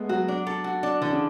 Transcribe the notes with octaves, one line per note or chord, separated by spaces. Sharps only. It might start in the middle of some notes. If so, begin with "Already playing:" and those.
Already playing: G#3 A3 B3
F#3 F#4
D4
A4
F#4
D4
D3 E3
C#3